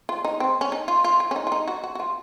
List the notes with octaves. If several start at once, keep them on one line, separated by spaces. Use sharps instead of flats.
F4
D#4
C4
C#4
D#4
F4
F4
F4
C#4
D#4
F4
D#4
F#4
F#4
F#4
F4